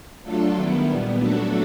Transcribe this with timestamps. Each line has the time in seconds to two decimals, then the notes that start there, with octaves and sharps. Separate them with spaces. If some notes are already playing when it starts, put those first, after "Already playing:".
0.23 F#3 A3 D4 F4 A4
0.55 D#3 G3 B3 E4
0.87 A#2 G3 B3
1.19 F#3 A3 D4 F#4 A4